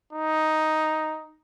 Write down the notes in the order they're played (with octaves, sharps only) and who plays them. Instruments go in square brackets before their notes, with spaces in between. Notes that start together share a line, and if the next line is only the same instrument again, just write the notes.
[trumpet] D#4